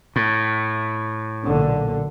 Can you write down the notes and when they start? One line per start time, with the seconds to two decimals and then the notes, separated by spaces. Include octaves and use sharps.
0.16 A2
1.44 B1 A#2 D3